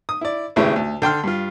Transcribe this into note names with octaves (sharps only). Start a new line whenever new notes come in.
D#6
E4 D5
G#1 A2 C#3 E4 G4 B4
D2
D3 G5 C6 F6
G2 F4